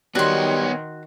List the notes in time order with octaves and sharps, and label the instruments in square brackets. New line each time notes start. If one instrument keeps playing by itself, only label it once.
[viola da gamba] D#3 [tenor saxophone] G3 [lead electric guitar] B3 C#5 [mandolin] F#4 C6